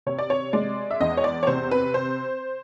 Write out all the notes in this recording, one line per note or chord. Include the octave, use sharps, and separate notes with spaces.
C3 C#5
D5
C#5
G#3 D5
E5
E2 D#5
C#5
D5
C#5
C3 C5
B4
C5